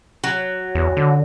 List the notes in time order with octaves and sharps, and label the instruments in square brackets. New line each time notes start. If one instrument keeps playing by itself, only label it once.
[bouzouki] F#3
[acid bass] E2
D3